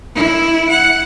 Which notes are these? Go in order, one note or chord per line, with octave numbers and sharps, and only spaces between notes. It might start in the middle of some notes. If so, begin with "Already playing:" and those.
E4
F#5